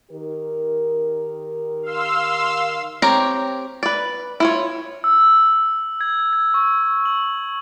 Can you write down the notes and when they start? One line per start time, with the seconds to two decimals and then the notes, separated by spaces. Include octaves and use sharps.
0.11 D#3 G4 A#4
1.83 F5 C6 E6
3.02 C4 G4 A#4 C#5 A#5
3.83 B4 D5
4.40 E4 F4 C#5
5.04 E6
6.01 G#6
6.33 G#6
6.54 C#6
7.05 F#7